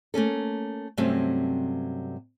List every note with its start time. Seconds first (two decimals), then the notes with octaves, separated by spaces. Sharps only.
0.14 A3 A#3 C#4 A4
0.97 G2 C3 F#3 A3 C4 C#4